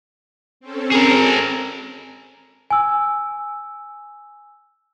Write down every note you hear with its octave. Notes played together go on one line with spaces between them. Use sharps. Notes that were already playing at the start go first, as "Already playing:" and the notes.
C4 C#4 A4
G#4 A#4
G#5 E6